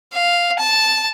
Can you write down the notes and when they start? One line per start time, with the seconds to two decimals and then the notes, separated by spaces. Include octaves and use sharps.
0.13 F5
0.59 A5